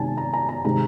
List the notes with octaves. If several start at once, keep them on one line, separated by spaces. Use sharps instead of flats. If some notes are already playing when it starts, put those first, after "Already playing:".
Already playing: C3 D#3 G#3 G#5 A5
A#5
A#5
A#5
C3 D#3 G#3 A#5